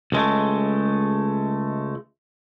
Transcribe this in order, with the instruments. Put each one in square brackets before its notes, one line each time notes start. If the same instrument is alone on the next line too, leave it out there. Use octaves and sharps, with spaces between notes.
[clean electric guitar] C#2 G#3 A3